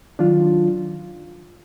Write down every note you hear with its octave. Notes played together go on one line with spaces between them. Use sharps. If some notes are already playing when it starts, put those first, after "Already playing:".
D#3 F#3 D4 F4